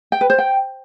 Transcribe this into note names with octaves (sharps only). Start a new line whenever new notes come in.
G5
B4
C5
G5